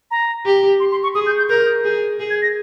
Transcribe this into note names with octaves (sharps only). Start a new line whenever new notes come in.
A#5
G4
C6
C6
C#6
G#4 D#6
G6
G6
A#4 G6
G#4
G#4
G#6
A#6